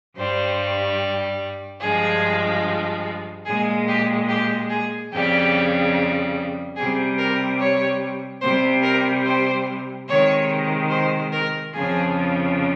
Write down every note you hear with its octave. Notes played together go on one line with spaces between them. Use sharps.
G2 G3 C5
G2 F3 G#3 G#4
A#2 G#3 G#4
G4
G4
G#4
F2 C#3 G3 G4
C3 G3 G#4
A#4
C#5
C3 G3 C5
A#4
C5
C3 D#3 G#3 C#5
C5
A#4
F2 C#3 F3 G#4